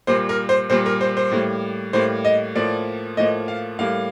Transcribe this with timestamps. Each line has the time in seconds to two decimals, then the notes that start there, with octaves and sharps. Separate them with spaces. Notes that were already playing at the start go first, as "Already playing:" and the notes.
0.07 A#2 G3 A#3 C5
0.29 A#4
0.49 C5
0.70 A#2 G3 A#3 C5
0.86 A#4
1.01 C5
1.17 C5
1.32 A2 G3 A#3
1.93 A2 G3 A#3 C5
2.25 D#5
2.55 A2 F3 A#3 D5
3.17 A2 F3 A#3 D#5
3.48 F5
3.79 A2 G3 A#3 F5